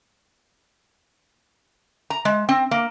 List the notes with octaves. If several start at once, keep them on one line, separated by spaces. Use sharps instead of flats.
A#5
G#3
C4
A#3